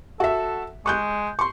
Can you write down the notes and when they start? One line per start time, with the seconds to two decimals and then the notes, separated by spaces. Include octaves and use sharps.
0.20 F#4 A4 E5
0.86 G#3 C#6 F#6 G6
1.39 C6 C#6